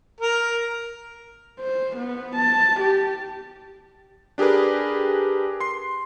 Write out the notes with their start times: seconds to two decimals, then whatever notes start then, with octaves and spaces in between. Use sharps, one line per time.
0.20 A#4
1.60 C5
1.97 B3
2.36 A5
2.80 G4
4.38 D4 G4 G#4 A#4 B4
5.60 C6 C7